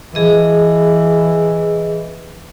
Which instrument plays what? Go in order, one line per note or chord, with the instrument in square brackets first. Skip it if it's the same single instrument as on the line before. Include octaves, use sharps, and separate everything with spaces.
[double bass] E3 [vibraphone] G#4 D#5